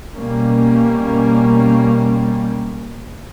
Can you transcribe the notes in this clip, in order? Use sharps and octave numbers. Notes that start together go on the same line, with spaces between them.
B2 G3 A#3 C#4